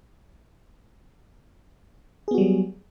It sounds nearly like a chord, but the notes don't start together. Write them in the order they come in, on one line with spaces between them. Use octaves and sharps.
G#4 B3 F#4 G3 F#3